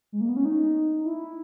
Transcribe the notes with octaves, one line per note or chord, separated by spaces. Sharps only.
G#3
A#3
B3
C#4
D#4
E4